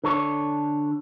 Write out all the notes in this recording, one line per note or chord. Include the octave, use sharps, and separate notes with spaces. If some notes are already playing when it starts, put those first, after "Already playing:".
D3 A4 C#5